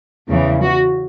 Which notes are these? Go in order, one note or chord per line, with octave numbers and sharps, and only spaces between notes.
E2 C#3 E3
F#4